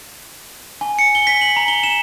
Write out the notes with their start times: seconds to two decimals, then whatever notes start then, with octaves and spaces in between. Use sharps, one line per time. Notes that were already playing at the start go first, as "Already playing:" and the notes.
0.81 G#5
0.99 C#7
1.15 G7
1.27 B6
1.41 F#7
1.56 A#5
1.68 G7
1.83 E7